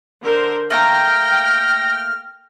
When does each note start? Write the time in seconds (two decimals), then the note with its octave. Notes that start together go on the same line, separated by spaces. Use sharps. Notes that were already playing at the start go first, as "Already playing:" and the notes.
0.22 D3 A#4 C5
0.70 A3 A#3 G5 A#5 F6 A#6